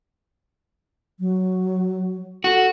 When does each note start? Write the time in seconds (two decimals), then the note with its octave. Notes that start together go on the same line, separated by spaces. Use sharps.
1.20 F#3
2.44 F#4 A4